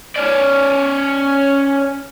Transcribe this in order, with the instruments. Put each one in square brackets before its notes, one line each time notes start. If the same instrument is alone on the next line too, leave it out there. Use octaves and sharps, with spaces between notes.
[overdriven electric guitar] C#4 D5